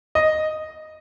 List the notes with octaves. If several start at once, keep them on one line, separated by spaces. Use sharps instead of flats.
D#5